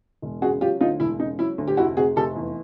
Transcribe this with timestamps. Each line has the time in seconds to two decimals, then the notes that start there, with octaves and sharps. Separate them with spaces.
0.22 E1
0.41 C#3 F#4 G#4
0.61 F#3 F4 G4
0.81 D2 D#4 F4
1.00 E1 E4
1.19 C#3 D#4
1.39 F#3 E4
1.58 D2
1.68 G4
1.77 F1 E4 F#4
1.97 C3 F#4 G#4
2.16 F1 G4 A4
2.36 E2